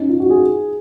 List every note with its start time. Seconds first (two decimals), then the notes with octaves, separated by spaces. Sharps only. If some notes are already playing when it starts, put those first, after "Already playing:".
Already playing: C#4 D#4
0.09 F4
0.20 F#4
0.30 G#4